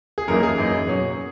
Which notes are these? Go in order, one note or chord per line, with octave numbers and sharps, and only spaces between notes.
G#4
F#2 E3 A#3 D#4 A#4
G#4
F#2 E3 A#3 D#4
B2 F#3 C#4